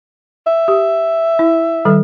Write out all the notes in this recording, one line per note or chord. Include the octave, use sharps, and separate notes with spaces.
E5
G4
E4
D#3 G3 A4